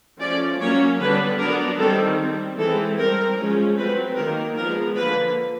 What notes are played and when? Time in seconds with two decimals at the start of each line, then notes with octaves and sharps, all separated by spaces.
0.20 F3 A3 C#4 D5
0.60 F#3 A#3 C#4 C#5
0.99 D3 G3 B3 D4 B4
1.39 F#3 B3 D4 A#4
1.79 D#3 G3 C4 A4
2.19 G3 C4
2.58 E3 G#3 C4 A4
2.98 G3 C4 A#4
3.38 F3 G#3 C#4
3.77 F#3 A3 C4 B4
4.16 D#3 F#3 A#3 A#4
4.56 F3 G#3 B3 D4 A#4
4.96 D3 F3 A#3 B4